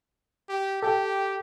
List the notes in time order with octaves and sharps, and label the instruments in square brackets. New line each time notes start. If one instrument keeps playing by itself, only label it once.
[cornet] G4
[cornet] G4 [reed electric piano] A4 G5